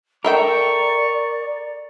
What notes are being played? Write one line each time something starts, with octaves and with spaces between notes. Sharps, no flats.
A4 A#4 D5 E5 G5 C#6